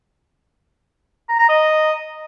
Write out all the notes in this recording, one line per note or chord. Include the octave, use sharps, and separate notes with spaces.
A#5
A#5
D#5